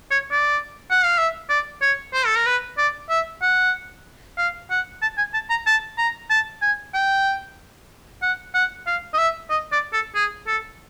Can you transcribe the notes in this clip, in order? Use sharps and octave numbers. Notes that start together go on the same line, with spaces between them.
C#5
D5
F#5
F5
E5
D5
C#5
C5
A4
A#4
B4
D5
E5
F#5
F5
F#5
A5
G#5
A5
A#5
A5
A#5
A5
G#5
G5
F#5
F#5
F5
D#5
E5
D#5
D5
A4
G#4
A4